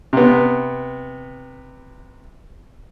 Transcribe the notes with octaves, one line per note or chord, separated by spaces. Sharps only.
C3 B3